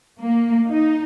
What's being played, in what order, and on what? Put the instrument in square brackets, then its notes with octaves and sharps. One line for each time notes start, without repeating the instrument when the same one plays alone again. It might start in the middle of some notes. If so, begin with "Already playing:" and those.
[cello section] A#3
D#4